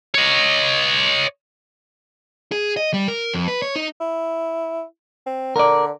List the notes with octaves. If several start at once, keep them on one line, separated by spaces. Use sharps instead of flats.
C#5 D#5
G#4
D#5
G3
A#4
F2
B4
C#5
D#4
E4
C4
D3 A#4 D5